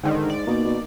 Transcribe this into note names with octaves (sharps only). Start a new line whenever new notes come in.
G#2 D3 D#3
D5
B2 A#3 D#4
B2